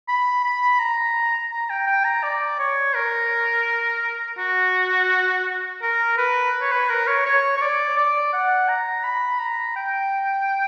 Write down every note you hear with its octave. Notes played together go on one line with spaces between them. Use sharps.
B5
B5
A#5
A#5
G5
G5
A#5
D5
C#5
A#4
F#4
A#4
B4
C#5
B4
A#4
C#5
C#5
C#5
D5
D5
F#5
A#5
B5
A#5
G5